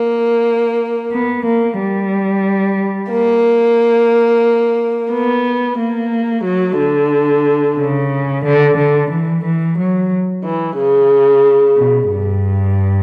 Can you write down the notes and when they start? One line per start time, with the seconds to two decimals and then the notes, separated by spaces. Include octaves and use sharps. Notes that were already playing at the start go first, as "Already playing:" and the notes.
Already playing: A#3
1.11 B3
1.45 A#3
1.77 G3
3.10 A#3
5.11 B3
5.77 A#3
6.45 F#3
6.78 D3
7.77 C#3
8.44 D3
8.77 D3
9.10 E3
9.44 E3
9.77 F#3
10.44 E3
10.77 C#3
11.77 B2
12.10 G2